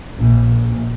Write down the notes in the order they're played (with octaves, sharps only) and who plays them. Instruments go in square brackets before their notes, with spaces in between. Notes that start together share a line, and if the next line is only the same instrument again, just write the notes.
[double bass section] A#1